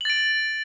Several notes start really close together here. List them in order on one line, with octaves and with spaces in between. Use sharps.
F#7 A6 D7